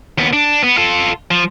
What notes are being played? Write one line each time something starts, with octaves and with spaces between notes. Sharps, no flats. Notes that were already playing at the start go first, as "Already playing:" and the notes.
D#2 B3
D4
B3
F4 A4
F3